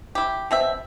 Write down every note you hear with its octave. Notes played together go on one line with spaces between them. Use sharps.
E4 G4
B2 C4 E5